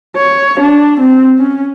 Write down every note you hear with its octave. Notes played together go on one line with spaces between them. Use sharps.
C#5
D4
C4
C#4